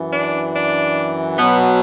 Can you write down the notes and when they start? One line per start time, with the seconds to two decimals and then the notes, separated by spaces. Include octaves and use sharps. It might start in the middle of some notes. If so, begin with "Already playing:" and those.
Already playing: F#2 E3
0.11 D4
0.54 D4
1.38 B2 F#3 B3